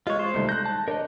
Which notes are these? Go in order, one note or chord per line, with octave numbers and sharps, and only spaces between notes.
G#3 F4 C#5
C5
C2 D#3 A3
F#6 G6 A#6
A5
D4 A#4 C#5 D#5